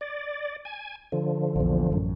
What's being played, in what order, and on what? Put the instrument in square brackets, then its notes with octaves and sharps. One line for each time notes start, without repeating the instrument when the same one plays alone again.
[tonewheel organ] D5
G#5
D3 F3
[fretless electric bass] A#1 E2
A1 F#2